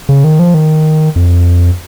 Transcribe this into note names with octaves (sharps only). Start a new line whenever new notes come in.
C#3
D#3
F3
D#3
F2